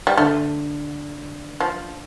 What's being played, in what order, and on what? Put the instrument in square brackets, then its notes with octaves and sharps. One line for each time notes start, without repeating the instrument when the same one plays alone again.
[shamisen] G3
[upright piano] D3 [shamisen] A3
[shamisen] F3